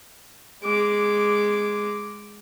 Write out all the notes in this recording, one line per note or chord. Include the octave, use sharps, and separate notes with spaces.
G#3 D6